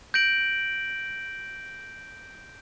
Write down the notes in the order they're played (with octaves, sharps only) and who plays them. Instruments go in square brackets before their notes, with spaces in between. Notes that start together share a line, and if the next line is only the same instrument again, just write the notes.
[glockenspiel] G6 A#6 D7 F#7